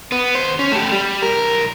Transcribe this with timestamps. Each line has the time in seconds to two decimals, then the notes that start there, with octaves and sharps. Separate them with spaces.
0.12 B3
0.35 D#2 C5
0.59 C#4
0.72 A3 G4
0.92 G3
1.22 B1 A#4